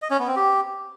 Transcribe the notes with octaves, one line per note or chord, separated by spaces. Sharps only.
D#5
C#4
B3
C4
G4